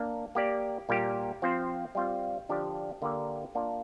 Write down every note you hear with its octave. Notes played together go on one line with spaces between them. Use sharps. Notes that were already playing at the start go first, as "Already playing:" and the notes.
Already playing: A#3 D4
A#3 G4 D5
A#2 G3 A#3 G4 A#4
F3 C4 F4 C5
G3 C4 F4 C5
D3 F3 D4 G4 D5
D3 A#3 G4 A#4 D5
A#3 D4 F4 D5